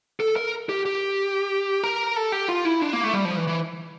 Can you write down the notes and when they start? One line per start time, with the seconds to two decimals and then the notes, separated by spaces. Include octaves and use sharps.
0.20 A4
0.36 A#4
0.69 G4
0.86 G4
1.84 A#4
2.16 A4
2.32 G4
2.49 F4
2.65 E4
2.82 D4
2.93 A#3
3.04 A3
3.14 G3
3.25 F3
3.37 E3
3.47 E3